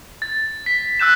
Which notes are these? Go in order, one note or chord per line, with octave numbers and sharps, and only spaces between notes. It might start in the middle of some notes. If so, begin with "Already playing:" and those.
A6
B6
E6 F#6 G6 E7